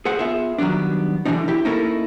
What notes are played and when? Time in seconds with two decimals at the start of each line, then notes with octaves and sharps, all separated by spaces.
0.05 G#4 C5 F#5
0.19 B3 F4 G#4 E5
0.58 D#3 F#3 G3 B3 D4
1.25 D3 E3 G3 G#3 D4 D#4
1.48 E4 G4
1.65 A#3 C#4 D#4 E4 A4 A#4